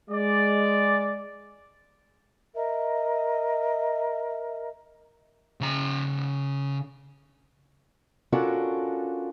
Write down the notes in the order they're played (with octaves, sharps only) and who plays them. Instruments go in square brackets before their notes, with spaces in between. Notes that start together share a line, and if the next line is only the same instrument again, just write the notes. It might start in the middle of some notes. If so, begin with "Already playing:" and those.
[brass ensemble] G#3 D5
[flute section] A#4 D#5 E5
[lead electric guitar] C#3 A#5
[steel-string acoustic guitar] C#4 D4 F4 F#4 A4 A#4